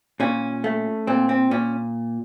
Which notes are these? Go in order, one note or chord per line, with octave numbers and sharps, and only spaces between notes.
A#2 C#4
A3
A#2 C4
C4
A#2 C#4